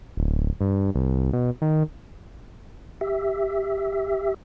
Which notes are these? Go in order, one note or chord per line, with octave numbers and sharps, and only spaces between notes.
D1
G2
C2
B2
D#3
G4 E5